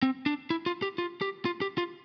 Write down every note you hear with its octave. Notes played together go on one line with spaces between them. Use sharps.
C4
D4
E4
F4
G4
F4
G4
F4
G4
F4